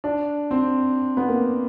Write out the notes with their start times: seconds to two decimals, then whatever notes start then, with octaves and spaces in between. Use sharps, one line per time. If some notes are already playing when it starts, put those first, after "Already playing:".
0.04 D4
0.51 C4
1.17 B3
1.28 A#3